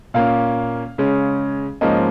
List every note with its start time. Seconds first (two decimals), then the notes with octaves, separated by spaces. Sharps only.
0.14 A#2 A#3 C#4 F5
0.98 C#3 G#3 C#4
1.81 G#2 F3 A#3 C#4 D#5